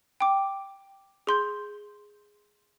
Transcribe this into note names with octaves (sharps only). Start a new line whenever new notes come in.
G5 D6
G#4 C6 G6